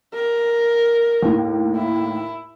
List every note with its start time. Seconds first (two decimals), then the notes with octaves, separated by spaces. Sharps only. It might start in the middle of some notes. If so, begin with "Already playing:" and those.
0.14 A#4
1.22 D#2 A2
1.77 E4